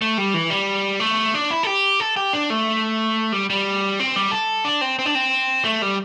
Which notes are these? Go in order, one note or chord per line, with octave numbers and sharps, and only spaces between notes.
A3
G3
E3
G3
A3
D4
E4
A4
G4
A4
G4
D4
A3
G3
G3
C4
G3
A4
D4
C4
C4
D4
C4
A3
G3